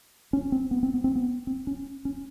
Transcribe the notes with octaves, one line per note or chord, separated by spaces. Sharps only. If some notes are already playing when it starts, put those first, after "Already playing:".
C#4
C4
B3
C4
B3
C4
B3
C4
C#4
C#4